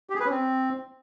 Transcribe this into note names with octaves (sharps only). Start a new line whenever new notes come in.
G4
G#4
B4
C#4
C4